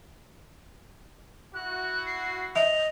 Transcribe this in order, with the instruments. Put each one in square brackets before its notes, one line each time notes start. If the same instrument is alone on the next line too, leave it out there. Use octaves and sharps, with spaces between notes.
[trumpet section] E4 F#4 [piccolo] F#6
[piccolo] C7
[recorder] D#5 [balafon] E5 [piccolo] F7